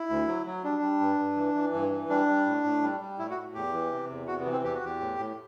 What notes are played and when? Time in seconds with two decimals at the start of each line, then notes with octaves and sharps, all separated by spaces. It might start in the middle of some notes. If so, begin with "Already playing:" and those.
Already playing: E4
0.10 D2
0.27 F#3
0.46 F#3
0.64 G3 D4
0.82 G3
1.00 G2
1.19 G2
1.37 E3
1.55 E3
1.74 G2
1.91 E3
2.09 G3 D4
2.28 G3
2.46 A2
2.64 A2
2.82 G3
3.01 G3
3.18 A2 E4
3.30 F#4
3.37 A2
3.54 E2 G4
3.73 E3
3.91 C3
4.10 E2
4.27 C3 F#4
4.40 B3
4.46 E3
4.52 C4
4.64 E2 G4
4.75 F#4
4.82 E2 G4
5.01 A2
5.18 A2